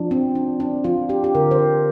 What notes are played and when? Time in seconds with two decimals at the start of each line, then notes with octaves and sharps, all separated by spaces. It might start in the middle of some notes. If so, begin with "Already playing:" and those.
Already playing: F3 D4
0.11 C4
0.35 D4
0.60 D4
0.84 F3 F4
1.09 D4 G4
1.24 G4
1.35 D3 A#4
1.51 C5
1.59 D4